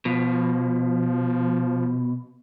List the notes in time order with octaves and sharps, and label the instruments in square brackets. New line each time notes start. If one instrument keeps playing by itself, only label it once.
[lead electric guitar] B2 [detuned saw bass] F3